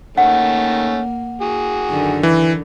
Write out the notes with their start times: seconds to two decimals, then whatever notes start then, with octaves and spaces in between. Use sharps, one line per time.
0.18 D#3 A3 A#3 C#4 F#5
1.42 F#4 G#4
1.88 F#2 D3 D#3
2.23 E3